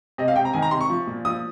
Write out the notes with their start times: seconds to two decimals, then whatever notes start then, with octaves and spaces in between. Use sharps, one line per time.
0.18 C3 D#5
0.28 F5
0.36 C3 G5
0.45 A#5
0.53 D#3 G#5
0.62 A#5
0.71 C3 C6
0.81 C#6
0.89 F3
1.07 A#2
1.25 F3 D#6